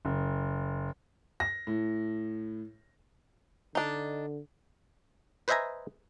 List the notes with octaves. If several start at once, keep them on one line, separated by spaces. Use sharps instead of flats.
F#1
A#6
A2
D3 D4 D#4
B4 C5 D#5 E5 G#5 A#5